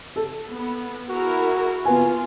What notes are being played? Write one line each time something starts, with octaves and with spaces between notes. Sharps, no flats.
A4
B3
E4 F#4 G#4 A#4
B3 F4 B4 G#5